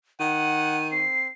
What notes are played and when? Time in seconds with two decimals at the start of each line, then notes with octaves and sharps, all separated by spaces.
0.20 D#3 F#5 D#7
0.92 C4 C7